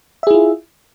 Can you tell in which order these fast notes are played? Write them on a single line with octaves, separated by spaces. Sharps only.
E5 G#4 E4 F4